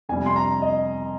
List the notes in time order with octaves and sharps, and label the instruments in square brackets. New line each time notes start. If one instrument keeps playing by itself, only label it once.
[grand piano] F2 C3 G3 G#5
C6
A#5
D#5